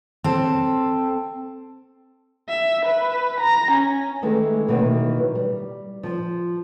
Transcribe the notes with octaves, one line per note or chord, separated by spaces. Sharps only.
C4 A4
E5
B4
A#5
C#4
D#3 E3 G#3 A3
B2 D#3 E3 F#3 A#3 B3
G3
F3